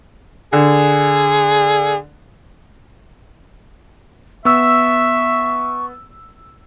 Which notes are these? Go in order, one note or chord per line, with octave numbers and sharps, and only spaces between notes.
D3 G#4
B3 E5 C#6 E6